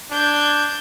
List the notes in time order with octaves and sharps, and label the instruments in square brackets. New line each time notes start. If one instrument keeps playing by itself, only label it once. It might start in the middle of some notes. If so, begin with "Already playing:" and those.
[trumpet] D4 [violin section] G6 G#6